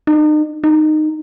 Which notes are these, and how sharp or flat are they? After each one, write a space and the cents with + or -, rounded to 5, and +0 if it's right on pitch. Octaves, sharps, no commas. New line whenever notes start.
D#4 -40
D#4 -15